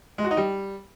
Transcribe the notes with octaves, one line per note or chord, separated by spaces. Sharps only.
G#3
F#4
D#4
G3